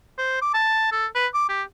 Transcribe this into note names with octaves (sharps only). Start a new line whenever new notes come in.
C5
D6
A5
A4
B4
D6
G4